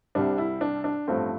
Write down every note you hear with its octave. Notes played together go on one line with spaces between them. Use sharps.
C2 C3 G3 D4
E4
D4
D4
A1 G2 F3 A3 C4